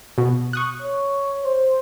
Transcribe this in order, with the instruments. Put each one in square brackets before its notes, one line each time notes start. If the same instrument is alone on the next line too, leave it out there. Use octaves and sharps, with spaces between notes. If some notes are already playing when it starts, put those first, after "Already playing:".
[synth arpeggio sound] B2
C#6 D#6 F#6
[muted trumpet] C#5
C5